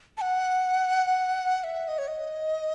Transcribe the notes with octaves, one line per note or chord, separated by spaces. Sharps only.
A5
F#5
E5
D#5
C#5
D#5